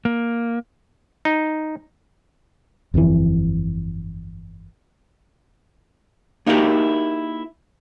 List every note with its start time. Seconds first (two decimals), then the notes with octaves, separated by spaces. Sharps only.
0.05 A#3
1.25 D#4
2.94 G1 F2 A#2 E3
6.46 A#3 D#4 E4 F#4 G4 A#4